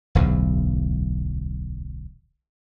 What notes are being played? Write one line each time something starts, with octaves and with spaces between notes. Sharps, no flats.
D1 B1 E2